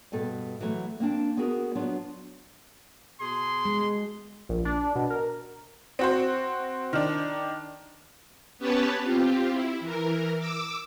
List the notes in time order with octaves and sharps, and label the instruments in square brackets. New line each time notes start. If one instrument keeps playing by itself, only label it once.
[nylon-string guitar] G2 B2 A4
E3 F#3 A3
A#3 C4 D4
B3 F#4 G#4 A#4
F#3 B3 D4 F4
[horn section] B2 G#4 C6
[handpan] G#3
[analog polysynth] A#1
D4
B2
A#4
[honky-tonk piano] C4 F#4 C5
D#3 D4
[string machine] B3 C#4 G4 B4 C#5 A5
C4 F4 G4
E4
E3 A#4
D6 E6